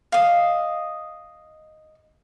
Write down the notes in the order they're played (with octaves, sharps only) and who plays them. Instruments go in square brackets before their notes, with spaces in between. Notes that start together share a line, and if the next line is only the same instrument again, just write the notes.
[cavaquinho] D#5 F5